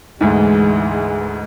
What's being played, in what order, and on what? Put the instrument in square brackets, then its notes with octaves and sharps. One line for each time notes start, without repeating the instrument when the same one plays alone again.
[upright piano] D2 G#2 [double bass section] E3 G#3